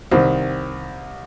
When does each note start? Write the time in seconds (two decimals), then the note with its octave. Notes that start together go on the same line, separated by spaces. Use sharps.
0.11 C2 D#3 C5